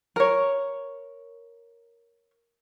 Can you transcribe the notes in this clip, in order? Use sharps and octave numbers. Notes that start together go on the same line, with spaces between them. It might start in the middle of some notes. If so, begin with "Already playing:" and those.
A#4 C#5